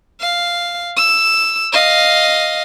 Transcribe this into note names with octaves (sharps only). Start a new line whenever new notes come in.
F5
E6
D#5 F5